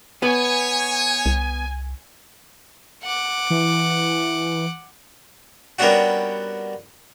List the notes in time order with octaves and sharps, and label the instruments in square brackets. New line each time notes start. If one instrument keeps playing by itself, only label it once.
[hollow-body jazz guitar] B3 B4 [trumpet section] C#5 [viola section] G#5
[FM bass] C2
[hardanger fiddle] F#5 D6
[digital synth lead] E3
[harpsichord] G3 A#3 B3 C#4 D4 F#4